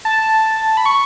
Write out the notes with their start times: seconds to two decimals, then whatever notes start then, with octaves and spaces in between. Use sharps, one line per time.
0.05 A5
0.77 B5
0.86 C#6